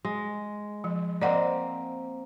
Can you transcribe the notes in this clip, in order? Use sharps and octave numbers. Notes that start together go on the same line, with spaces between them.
G#3
F3
A#3 C4 D5 D#5 F#5